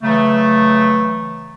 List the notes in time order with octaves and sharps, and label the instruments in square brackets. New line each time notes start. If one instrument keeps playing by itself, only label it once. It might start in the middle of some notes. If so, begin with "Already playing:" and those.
[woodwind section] C#3 E3 F#3 A3